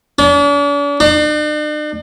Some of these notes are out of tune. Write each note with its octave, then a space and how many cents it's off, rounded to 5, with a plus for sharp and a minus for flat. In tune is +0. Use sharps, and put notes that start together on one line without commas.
D4 -45
D4 +45